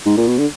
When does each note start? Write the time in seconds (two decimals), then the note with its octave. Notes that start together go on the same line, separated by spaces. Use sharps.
0.06 G#2
0.17 A#2
0.28 B2
0.38 D3